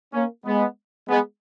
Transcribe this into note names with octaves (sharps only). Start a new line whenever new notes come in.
A#3 C#4
G#3 B3
G#3 B3